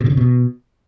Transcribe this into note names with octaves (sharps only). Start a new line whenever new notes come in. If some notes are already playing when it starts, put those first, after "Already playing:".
B2
D3
C#3
B2